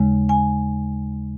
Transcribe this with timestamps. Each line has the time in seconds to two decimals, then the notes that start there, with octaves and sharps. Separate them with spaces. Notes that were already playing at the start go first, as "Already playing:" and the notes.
Already playing: D#2 C#3 G#3
0.29 G#5